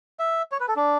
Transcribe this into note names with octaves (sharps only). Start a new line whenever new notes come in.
E5
C#5
B4
A4
D4